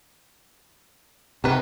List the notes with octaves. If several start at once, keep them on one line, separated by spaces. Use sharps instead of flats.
C3 D#4 B4